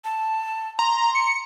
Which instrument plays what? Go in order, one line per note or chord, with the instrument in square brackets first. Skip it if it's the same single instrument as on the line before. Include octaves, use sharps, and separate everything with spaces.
[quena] A5
[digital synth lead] A#5 [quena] C6
[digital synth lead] C#7